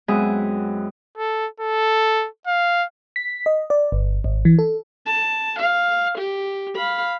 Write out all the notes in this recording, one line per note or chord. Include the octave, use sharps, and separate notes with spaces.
F#2 G#3 B3 C4 G#4 E5
A4
A4
F5
B6
D#5
D5
G1
G#1
E3
A4
A5
F5
G4
F5 B5